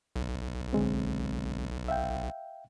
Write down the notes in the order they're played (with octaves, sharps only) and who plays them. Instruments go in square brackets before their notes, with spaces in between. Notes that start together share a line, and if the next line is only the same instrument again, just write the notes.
[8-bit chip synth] B1
[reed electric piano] D3 G#3 C4
E5 F5 G5